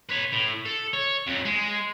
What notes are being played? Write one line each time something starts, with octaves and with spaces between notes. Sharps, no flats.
B4 C#5
A2
A4
C#5
F2 F#3
G#3